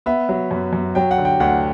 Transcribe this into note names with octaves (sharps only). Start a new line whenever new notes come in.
B3 E5
F#3
F#2
F#2
F#3 G5
F#5
D3
G5
D2 F#5